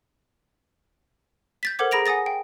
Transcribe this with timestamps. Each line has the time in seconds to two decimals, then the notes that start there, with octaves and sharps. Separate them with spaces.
1.63 G6 A6 B6
1.79 A4 A#4 C5 F#5 D6 G#6
1.91 G#4 A#5 B5 A#6 D7 F7
2.06 F#5 G#5 D#6 A6 A#6
2.26 G5